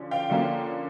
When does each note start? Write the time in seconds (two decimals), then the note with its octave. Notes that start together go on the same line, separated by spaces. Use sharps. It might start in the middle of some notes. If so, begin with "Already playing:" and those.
Already playing: D3 F3 C#4
0.11 F5 G5
0.30 D3 F3 A#3 C#4